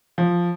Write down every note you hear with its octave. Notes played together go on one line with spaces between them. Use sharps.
F3